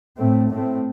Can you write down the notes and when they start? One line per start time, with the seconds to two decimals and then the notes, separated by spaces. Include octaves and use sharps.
0.18 A2 A3 C4
0.51 A2 A3 C4